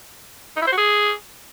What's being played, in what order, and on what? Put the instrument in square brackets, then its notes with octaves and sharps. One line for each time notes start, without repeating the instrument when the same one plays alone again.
[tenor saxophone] D#4
E4
C5
F#4
G#4